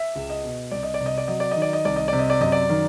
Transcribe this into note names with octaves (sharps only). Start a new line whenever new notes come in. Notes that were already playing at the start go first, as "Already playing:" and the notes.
Already playing: E5
C#2
D#5
B2
C2 D5
D#5
D5
C3
D#5
D5
F#3 D#5
D5
D#3 D#5
D5
D#5
C2 D5
D#5
C3 D5
D#5
D5
F#2 D#5
D5
D#3